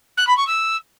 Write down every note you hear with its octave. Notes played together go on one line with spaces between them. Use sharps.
F#6
B5
C#6
E6